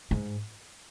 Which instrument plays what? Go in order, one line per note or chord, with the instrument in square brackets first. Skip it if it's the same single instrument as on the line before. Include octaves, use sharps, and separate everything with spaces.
[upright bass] G#2